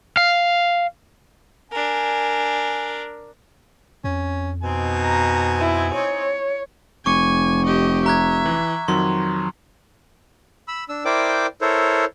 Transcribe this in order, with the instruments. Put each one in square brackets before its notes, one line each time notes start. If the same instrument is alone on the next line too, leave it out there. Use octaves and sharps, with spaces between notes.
[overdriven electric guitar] F5
[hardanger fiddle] D4 A#4 [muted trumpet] G#5
[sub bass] F2 [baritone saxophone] C#4
[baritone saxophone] B2 [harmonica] C4 D#4 G#5
[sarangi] A#5
E4
C#5
[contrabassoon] F1 [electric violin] G#5 [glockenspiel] C#6 D6 C#7
[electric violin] G4 D#5
[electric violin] E5 [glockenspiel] A#5 F#6 G#6
[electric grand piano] E3
[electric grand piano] F2 D#3 F#3 [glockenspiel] C6
[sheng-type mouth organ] B5 E6
D4 E6
E4 A#4 C5 D5 G5 D6
E4 A4 A#4 C5 C#5